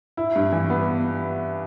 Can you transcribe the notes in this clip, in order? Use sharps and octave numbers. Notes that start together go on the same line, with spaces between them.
E4
G2
E3
B3